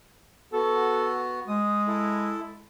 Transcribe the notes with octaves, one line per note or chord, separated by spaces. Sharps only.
B3 F#4 A4
G#3 D#6
E4 A4